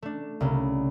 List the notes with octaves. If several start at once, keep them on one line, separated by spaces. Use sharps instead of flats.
A3 D4
C2 C#3